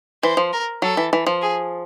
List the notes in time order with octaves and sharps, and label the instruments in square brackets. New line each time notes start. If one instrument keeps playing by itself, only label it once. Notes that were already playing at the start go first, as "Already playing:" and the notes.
[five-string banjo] E3 [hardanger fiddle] C5
[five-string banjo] F3
[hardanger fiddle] A#4
[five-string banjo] F#3 [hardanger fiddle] A4
[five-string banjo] E3
E3
F3
[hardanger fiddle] G#4